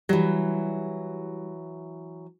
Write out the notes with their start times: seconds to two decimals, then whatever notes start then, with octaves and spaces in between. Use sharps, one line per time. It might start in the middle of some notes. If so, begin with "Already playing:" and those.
0.09 E3 F#3 G3